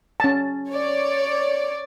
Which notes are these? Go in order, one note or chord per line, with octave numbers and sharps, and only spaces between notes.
C#4 A5
C#5 D5